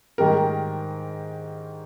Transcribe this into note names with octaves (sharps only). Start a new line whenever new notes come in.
G#2 D#3 G3 A#4